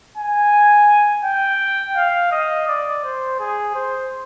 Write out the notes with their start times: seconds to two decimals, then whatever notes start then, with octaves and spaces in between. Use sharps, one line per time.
0.17 G#5
1.25 G5
1.97 F5
2.32 D#5
2.68 D5
3.04 C5
3.39 G#4
3.75 C5